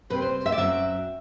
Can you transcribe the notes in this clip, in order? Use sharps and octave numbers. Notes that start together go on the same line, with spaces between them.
C3 G3 C4 B4
C5
E5
D5
F#2 F#3 C4 E5